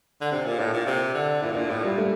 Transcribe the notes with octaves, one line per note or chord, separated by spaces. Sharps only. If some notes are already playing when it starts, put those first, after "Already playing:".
D3
C3 D4
A#2
A2
A#2
C3
D3
A#2 E4
A2
A#2 D4
A2 E4
A#2 G3
A3